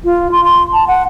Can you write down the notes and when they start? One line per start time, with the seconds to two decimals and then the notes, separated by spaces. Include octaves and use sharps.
0.05 F4
0.32 C6
0.44 C6
0.73 A5
0.88 F#5